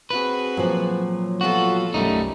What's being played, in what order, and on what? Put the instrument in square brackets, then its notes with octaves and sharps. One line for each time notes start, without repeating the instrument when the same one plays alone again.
[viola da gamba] C4 F#4 G#4 [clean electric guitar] B4
[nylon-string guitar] A#2 F3 [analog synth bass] F#3
[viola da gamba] B3 F4 A4 [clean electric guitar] F#4
[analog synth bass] B1 [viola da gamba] F#2 G3 [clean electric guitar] A3 D#4